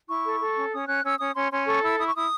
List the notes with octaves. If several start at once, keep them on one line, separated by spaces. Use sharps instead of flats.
E4 C#6
A4
A4
C#4
C#4 D#6
C#4 F#6
C#4 E6
C#4 D#6
C#4 C6
C#4 C6
A4 C#6
E4 E6
E4 D#6
C#6
E4 D#6